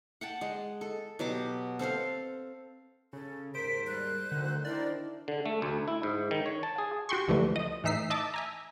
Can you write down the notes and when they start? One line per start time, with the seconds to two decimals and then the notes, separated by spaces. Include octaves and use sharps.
0.21 F#5 G5 A5
0.41 G#3
0.81 A4
1.19 B2 F#3 G4 D6
1.79 C4 A4 C5 F5
3.13 C#3 A4
3.55 D#2 G#2 A#4 C5 B6 D7
3.87 G3 F#6
4.32 D2 D3 D#3
4.65 D#3 D4 E4 A#4 D5
5.28 D3
5.46 A3
5.62 D2
5.88 E4
6.03 G#2
6.31 D#3
6.46 C#5
6.63 A5
6.78 G#4
7.09 F#4 G4 C6 C#6
7.28 C#2 D3 E3 F3 G3 A3
7.56 D#5 D#6
7.84 A2 E3 D#4 E5 B6 C7
8.10 D#5 E5 A5 D6 A6
8.34 E5 G#5 A#5